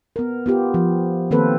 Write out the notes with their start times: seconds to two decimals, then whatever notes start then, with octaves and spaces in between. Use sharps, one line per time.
0.16 B3 A#4
0.46 B3 F4 G4
0.74 F3
1.31 D#3 A#3 C4 A4 B4 C5